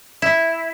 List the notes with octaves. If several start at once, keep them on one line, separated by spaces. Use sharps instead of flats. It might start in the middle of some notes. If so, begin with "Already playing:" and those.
E4